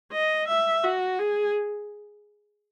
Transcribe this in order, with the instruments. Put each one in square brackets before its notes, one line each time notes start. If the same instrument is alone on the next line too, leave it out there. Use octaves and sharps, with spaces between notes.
[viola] D#5
E5
F#4
G#4